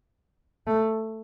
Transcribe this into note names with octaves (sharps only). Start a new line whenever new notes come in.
A3